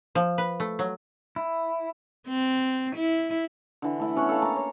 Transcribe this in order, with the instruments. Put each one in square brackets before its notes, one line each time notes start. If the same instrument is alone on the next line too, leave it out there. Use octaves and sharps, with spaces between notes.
[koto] F3
B4
A3
F#3
[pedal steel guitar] E4
[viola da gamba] C4
E4
[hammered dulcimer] D3 E3
A3 E4
B3 C#4 C#5 F#5
A4 F5
A#3 A5 A#5
C#5